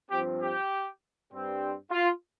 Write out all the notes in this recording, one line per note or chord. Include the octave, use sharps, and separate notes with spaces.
G2 F3 C4 G4
G4
G2 G3 C4
F4